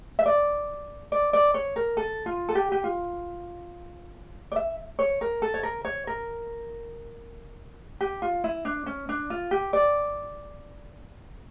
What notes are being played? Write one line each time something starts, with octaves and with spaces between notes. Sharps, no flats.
E5
D5
D5
D5
C#5
A#4
A4
F4
A4
G4
G4
F4
D5
E5
C#5
A#4
A4
C#5
A#4
C#5
A#4
G4
F4
E4
D4
C#4
D4
F4
G4
D5